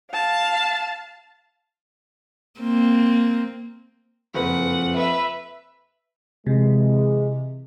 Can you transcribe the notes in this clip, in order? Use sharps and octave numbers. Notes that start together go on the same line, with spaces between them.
F5 A5
A#3 C4
F#1 F2 B4 F#5
B4 E5
C3 E3 G#3